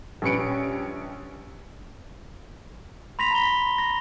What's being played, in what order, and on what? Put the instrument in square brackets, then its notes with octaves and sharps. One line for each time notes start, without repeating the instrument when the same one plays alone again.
[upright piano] A#1 G3 C#4 B4 C#7 D7
[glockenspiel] B5 C6 A#6 B6 F7
A#5 B6 G7
A#6